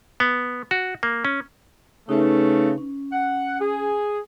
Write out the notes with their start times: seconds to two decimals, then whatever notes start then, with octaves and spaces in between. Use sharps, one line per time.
0.20 B3
0.71 F#4
1.03 A#3
1.25 C#4
2.09 C#3 A3 D#4 B4
2.78 C#4
3.13 F#5
3.60 G#4